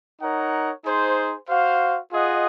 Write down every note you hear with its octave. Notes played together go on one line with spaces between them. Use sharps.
D#4 A#4 C#5 F#5
D#4 G#4 C5
F#4 C5 F5
F4 G#4 D#5 F#5